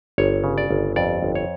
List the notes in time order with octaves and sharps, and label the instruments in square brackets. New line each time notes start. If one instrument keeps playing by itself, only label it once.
[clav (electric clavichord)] G1 C#5
C#3
D5
G1
F2 D5
G1
C#5